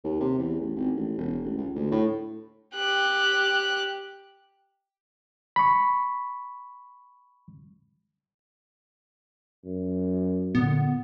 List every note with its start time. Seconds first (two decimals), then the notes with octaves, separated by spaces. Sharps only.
0.04 D#2
0.20 C3
0.39 E2
0.60 A1
0.76 G#1
0.96 A1
1.18 E1
1.44 A1
1.57 C#2
1.75 D2
1.92 A2
2.76 G4 F#6
5.56 B5 C#6
9.65 F#2
10.55 A#2 D3 B3